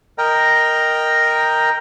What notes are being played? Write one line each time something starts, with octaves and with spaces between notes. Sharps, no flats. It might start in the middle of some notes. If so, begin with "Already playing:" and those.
A#4 D#5 G5 A#5